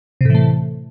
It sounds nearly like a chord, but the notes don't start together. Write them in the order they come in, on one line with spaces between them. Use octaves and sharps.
C3 A2 E3 A3